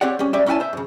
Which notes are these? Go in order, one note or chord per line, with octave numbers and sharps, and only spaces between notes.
C4 G4 C#5 D5 F#5
G3 C#4
G3 C#4 D5 E5
A#3 C#4 E4 F#5 G#5 A5
C5 E5
F#2 C#3